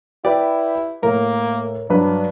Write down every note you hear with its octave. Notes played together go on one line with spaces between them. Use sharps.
E4 G4 B4 D5
A2 A#3 A#4
G2 F#3 D4 B4